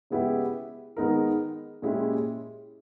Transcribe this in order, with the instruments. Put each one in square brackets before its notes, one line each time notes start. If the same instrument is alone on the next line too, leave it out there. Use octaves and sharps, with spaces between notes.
[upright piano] C#3 G#3 B3 E4 G4
D#3 G#3 B3 D#4 A#4
A#2 G#3 C#4 E4 G4